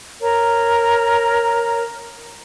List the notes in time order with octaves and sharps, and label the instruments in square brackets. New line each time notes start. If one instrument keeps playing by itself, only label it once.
[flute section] A#4 C#5 A#5